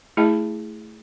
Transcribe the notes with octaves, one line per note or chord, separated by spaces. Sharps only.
A3 E4 G#4 D#5 G5 A5